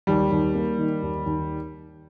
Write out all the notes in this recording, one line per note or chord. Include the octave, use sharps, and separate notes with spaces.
D#2 G3
D#2
A#3
D#3
D#2
D#2